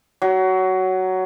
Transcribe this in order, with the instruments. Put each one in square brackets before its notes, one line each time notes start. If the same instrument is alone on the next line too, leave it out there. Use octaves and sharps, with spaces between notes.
[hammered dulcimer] F#3